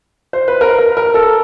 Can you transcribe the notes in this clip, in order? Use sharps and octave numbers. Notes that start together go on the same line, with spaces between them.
C5
B4
A#4
A#4
A#4
A4